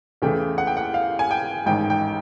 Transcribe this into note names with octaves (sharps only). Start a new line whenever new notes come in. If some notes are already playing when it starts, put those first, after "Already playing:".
E2 C#3 E3 A3 G5
F#5
G5
F#5
F5
G#5
G5
A1 G#2 D#3 G5
G5